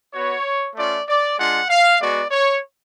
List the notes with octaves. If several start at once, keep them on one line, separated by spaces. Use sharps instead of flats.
B3 F#4 C#5
A3 C#4 F4 D5
D5
G#3 D4 F4 F#5
F5
G#3 B3 F#4 D5
C#5